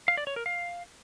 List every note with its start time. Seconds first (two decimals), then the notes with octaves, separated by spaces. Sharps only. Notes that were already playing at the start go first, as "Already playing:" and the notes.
0.08 F5
0.17 D5
0.27 C#5
0.36 A#4
0.46 F5